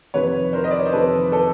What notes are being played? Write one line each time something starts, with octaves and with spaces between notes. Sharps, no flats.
F2 C3 D#3 B4 C#5
A#4 C5
D#5
D5
C#5
C5
F2 C3 D#3 A4 B4
A4 B4